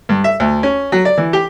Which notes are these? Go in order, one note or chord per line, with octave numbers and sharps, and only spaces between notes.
G2
E5
D2
C#4
F#3
D5
E3
G4